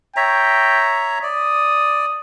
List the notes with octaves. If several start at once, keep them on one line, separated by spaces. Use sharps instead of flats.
C#5 E5 G5 A#5
D5 D#6